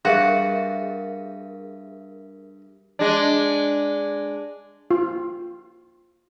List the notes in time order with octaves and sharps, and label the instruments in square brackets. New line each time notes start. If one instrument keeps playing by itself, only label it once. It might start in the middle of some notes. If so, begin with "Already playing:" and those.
[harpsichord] G2 [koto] F#4 [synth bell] G#4 A#4 E5 [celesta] F5
[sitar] G#3 D4
[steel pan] F4